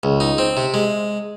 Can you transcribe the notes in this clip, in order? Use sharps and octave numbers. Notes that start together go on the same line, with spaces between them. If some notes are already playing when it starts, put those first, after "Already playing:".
C#2
D#4
C4
C3
G#3